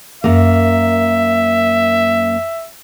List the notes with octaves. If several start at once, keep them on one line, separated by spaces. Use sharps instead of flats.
F#2 A#3 E5